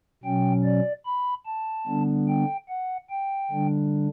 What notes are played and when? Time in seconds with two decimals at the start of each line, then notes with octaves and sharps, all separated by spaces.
0.23 B2 F#3 C#4 G5
0.64 D5
1.06 B5
1.46 A5
1.87 D3 G3 B3 D4
2.28 G5
2.69 F#5
3.10 G5
3.51 D3 G3 D4